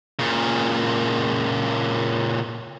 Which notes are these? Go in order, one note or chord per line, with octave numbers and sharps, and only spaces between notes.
A#2 C#3